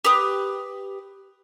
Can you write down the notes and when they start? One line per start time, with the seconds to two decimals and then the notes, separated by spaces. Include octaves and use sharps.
0.04 G4 B4 D#6